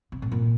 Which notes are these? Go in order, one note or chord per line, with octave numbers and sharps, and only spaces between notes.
C3
A2
A#2